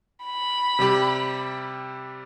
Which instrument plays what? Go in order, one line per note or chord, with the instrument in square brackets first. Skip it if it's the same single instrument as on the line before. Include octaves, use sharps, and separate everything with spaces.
[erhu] B5
[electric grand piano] C3 G3 G4